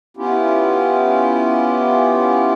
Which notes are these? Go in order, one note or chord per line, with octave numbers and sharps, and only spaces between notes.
B3 C#4 E4 F4 G4